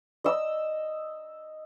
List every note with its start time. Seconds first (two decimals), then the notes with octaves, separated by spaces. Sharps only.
0.24 D#5 E6